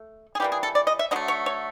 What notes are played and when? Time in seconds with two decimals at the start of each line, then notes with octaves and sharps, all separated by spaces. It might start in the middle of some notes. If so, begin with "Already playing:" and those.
Already playing: A3
0.35 G#4
0.40 E3 G3 A#3 G4
0.52 G#4
0.63 A4
0.75 D5
0.87 D#5
0.99 E5
1.11 D3 F#3 A3 D#5
1.28 C#5
1.46 C#5